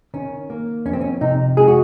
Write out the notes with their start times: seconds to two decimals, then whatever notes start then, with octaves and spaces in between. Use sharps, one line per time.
0.14 D#3 C#4
0.50 A#3
0.86 F2 C#4
0.93 C4
1.01 C#4
1.21 C3 D#4
1.57 G#3 G#4
1.68 F#4